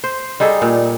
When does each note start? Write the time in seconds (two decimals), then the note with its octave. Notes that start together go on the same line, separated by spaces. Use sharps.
0.04 C5
0.40 G3 D#4 G#4 A4
0.62 A#2